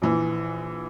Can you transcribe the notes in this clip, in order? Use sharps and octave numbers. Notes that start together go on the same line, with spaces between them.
A#1 E3